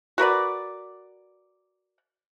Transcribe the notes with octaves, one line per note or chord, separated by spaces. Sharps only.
F#4 A#4 B4 D5